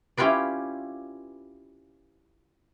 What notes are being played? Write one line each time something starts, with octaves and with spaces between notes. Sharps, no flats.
C#4 E4 F4 G4 B4 D5